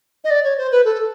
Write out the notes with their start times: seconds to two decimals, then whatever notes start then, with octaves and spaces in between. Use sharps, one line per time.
0.24 D#5
0.30 D5
0.44 C#5
0.58 C5
0.72 B4
0.85 A4